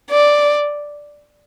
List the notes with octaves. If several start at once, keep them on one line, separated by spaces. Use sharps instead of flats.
D5